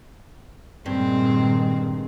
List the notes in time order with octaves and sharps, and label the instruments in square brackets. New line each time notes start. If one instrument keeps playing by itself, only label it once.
[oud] G2 [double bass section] A#2 D#3 G#3 [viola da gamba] C4